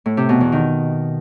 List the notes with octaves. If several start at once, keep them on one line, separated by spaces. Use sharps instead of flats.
A2
C3
B2
E2
D#3